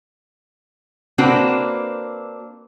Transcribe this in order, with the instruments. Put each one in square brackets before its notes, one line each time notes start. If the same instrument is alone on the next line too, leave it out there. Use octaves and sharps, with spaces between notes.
[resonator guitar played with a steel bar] A#3 C4 D4 F#4 B4